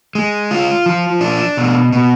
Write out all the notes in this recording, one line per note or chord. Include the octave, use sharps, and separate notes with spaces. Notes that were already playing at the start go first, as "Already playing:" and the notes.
G#3
F4
F3
D4
B2
B2